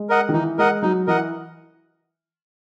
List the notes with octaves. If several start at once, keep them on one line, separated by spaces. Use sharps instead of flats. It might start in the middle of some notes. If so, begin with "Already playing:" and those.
Already playing: G#3
A#4 D#5 F#5
D#3
E3 D#4
G#3 A#4 D#5 F#5
F#3 D#4
E3 A#4 D#5 F#5